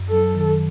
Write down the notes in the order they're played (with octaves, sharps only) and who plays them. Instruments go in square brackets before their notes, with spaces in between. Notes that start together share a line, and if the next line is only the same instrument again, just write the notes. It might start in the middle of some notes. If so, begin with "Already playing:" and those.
Already playing: [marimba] F#2
[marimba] F#3 [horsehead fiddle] A4
[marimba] D#3